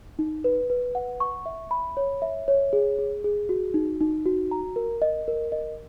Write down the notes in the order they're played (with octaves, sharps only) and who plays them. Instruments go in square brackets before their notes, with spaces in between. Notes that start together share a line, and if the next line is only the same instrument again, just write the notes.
[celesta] D#4
B4
B4
F#5
C#6
E5
B5
C#5
E5
C#5
G#4
G#4
G#4
F#4
D#4
D#4
F#4
A#5
A#4
D#5
A#4
D#5